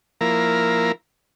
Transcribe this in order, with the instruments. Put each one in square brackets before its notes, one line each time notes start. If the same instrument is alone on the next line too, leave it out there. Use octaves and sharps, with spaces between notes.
[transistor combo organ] F3 A#3 E4 A#4